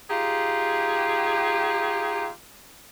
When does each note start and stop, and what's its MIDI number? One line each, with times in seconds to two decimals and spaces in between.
0.11 2.28 63
0.11 2.28 65
0.11 2.28 67
0.11 2.28 68